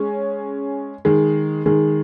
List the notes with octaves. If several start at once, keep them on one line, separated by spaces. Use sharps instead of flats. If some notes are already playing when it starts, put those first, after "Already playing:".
Already playing: G#3 C#4
D#3 G#3
D#3 G#3